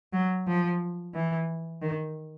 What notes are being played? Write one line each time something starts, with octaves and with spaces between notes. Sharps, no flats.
F#3
F3
E3
D#3